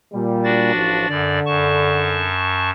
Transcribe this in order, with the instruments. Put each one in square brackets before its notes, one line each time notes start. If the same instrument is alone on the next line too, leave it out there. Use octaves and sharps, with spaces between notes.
[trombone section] A#2 G3
[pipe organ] D4 F#4 A6
[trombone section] A1 F3
[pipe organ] F#2 D5 [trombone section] D3
[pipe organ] F#2 A5 C#6